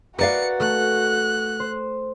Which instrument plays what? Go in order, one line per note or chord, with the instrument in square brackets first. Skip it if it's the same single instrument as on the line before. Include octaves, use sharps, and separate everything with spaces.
[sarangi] F#4 [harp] A#4 [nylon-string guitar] B4 D5 F5 [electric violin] C#7
[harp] A3 [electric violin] F#6
[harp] C5